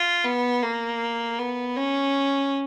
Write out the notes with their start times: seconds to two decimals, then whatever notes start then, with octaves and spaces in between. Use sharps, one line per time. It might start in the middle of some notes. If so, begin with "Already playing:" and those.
Already playing: F4
0.24 B3
0.63 A#3
1.39 B3
1.77 C#4